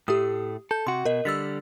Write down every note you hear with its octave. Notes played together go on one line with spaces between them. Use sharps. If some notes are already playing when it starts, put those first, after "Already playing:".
A2 A3 G4 D#6
A4 G6
C3 F#4 C6
B2 A#4 D#5
D3 G3 E6 A6 B6